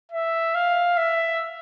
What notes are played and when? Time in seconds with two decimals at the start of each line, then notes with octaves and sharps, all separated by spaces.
0.12 E5
0.55 F5
0.97 E5